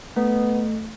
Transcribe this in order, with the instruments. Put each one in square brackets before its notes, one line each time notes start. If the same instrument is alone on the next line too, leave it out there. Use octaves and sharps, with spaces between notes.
[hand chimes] A3 [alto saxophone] B3